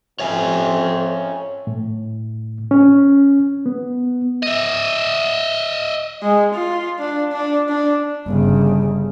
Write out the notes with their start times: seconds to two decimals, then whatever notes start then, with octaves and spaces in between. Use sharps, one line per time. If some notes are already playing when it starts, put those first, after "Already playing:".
0.20 F2 C#5 E5 G#5
1.67 A2
2.71 C#4
3.66 B3
4.43 D#5 E5
6.23 G#3
6.54 F4
6.99 D4
7.33 D4
7.69 D4
8.27 G1 C#3